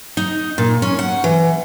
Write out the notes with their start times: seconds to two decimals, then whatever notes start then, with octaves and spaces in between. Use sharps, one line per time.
0.17 D#4
0.58 A#2
0.82 C#4
0.99 F#5
1.24 E3